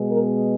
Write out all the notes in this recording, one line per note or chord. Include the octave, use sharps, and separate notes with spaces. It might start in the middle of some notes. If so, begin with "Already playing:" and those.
Already playing: B2 G#3 B3
A#4